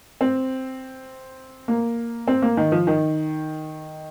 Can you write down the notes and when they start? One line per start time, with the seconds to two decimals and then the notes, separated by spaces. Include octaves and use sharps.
0.21 C4
1.68 A#3
2.28 C4
2.42 A#3
2.57 D#3
2.72 F3
2.87 D#3